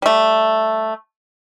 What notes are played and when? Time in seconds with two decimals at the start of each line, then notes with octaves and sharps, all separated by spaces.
0.02 G3 A3